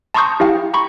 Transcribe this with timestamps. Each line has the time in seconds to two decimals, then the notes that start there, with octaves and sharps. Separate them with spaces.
0.14 A5 A#5 C6 C#6 D#6 G6
0.40 E4 G4 F5 G5
0.74 A#5 B5 C#6